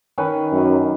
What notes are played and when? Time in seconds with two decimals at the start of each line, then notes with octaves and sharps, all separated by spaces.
0.18 D#3 C#4 B4
0.52 F#2